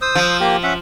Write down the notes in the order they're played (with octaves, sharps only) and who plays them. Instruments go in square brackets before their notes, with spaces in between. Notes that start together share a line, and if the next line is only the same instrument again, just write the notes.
[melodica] C5 D#6 E6
[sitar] F3
[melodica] A#3 G4
C#4 E5 F#5